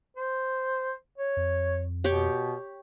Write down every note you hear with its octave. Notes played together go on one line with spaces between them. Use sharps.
C5
C#5
F2
B2 G4 C#5 G5